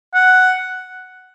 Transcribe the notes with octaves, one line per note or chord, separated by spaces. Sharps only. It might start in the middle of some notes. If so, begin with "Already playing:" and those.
F#5